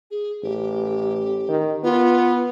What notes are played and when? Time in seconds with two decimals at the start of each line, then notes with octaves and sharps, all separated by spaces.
0.11 G#4
0.43 A1 G4
1.48 D#3
1.84 B3 F4